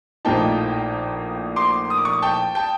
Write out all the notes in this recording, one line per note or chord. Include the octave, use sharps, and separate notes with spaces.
A#1 A2 F3 A#3 D#4 G5 A5
C6 D6
D#6
D6
C#6 D#6
G5 A5
G5 A5